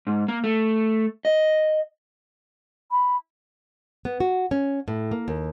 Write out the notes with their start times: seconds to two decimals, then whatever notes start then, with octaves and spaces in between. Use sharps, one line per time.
0.07 G#2
0.28 A#3
0.44 A3
1.25 D#5
2.91 B5
4.05 B3
4.20 F#4
4.51 C#4
4.88 A2
5.11 A#3
5.28 D#2